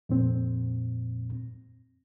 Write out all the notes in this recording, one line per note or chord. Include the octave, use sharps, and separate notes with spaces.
F2 A#2 C4